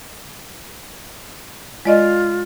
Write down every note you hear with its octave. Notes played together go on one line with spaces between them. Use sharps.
G#3 F4 D5 D#5